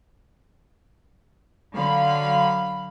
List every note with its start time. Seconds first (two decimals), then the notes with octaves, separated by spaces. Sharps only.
1.74 D3 F#3 F5 B5